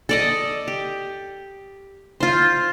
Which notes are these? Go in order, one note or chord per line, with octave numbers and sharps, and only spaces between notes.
A4 D5 D#5
G4
F4 C5